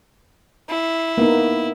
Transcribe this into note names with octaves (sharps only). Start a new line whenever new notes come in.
E4
A#3 B3 D#4